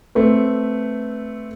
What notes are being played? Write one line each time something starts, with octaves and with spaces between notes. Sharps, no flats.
A3 C4 B4